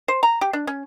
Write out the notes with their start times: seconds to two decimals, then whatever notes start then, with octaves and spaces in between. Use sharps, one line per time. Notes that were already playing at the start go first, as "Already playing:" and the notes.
0.08 C5
0.23 A#5
0.41 G4
0.53 D4
0.67 C#4